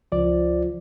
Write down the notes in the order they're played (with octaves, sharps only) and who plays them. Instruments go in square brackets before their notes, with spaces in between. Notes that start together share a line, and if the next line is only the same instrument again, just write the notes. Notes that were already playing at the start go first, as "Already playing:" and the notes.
[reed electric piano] C#2 D5 [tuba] F3